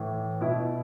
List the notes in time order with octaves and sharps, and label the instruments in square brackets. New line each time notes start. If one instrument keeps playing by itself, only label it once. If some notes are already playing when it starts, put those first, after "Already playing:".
Already playing: [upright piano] A2 E3
B2 E4